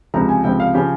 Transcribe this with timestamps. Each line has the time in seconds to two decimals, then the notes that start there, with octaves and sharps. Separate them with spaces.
0.14 C#2 C3 F3 A#5
0.29 G#5
0.44 C#2 C3 F3 G5
0.60 F5
0.74 C#3 F3 G4